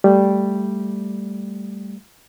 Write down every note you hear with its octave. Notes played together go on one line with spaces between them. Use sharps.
G3 A3